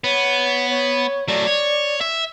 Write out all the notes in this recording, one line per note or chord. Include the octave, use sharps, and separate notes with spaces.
B3 C#5
C#5
F#3 A3 D5
C#5
E5